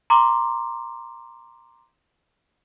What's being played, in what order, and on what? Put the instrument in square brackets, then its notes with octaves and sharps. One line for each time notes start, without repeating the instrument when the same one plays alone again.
[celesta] A#5 C6 D6